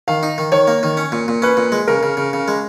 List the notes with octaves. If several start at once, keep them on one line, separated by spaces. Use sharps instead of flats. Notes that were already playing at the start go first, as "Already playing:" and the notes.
D#3 F5
D#4
D#3
D#3 C#5
A#3
D#3
C#4
A#2
A#2
C#4 B4
A#2
G#3
C#3 A#4
C#3
C#3
C#3
G#3